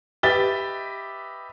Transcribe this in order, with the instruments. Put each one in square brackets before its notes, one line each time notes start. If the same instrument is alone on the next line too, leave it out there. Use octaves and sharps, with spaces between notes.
[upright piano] G4 B4 D#5 E5 A6 G7